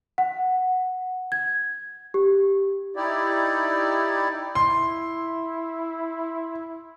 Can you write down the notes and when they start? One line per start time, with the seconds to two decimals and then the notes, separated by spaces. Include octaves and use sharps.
0.18 F#5
1.32 G#6
2.14 G4
2.96 D#4 E4 G4 D5
4.55 E4 C6